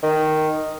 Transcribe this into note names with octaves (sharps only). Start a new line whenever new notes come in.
D#3